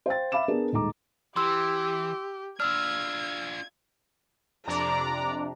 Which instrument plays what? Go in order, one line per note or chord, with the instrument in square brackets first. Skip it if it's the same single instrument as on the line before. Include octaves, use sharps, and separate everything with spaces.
[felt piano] C5 F5 G5 A6
E5 F5 B5 D6 E7
B3 D4 G#4 A#4 D5
D#1 G#3 D#4 A4 A#5 D6
[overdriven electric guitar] E3 [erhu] G4 [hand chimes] C6 E6
[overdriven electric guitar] D4 F4 [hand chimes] E6 F6 [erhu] G#6
[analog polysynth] F2 C3 D4 [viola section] D5 A#5